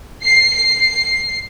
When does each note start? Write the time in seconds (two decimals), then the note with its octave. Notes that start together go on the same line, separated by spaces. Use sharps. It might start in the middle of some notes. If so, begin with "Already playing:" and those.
0.23 C7
0.56 C7